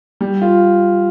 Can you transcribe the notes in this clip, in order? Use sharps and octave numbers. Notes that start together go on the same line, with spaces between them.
G3
F4